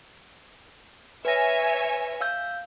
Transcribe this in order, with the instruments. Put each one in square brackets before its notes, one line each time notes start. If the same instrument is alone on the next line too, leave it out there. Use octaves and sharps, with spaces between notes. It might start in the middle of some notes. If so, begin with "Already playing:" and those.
[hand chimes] B4 A#6 [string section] C#5 E5 G#5
[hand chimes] F5 E6 G6